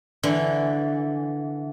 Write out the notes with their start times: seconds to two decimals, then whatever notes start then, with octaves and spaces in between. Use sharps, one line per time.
0.23 D3 E3